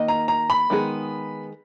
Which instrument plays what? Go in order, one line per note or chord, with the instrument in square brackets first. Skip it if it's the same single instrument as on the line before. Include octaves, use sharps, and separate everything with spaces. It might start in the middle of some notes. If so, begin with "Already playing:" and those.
Already playing: [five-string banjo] D#3 A#3 D#5
[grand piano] A#5
A#5
B5
[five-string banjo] D#3 G#3 B3 F4 G#4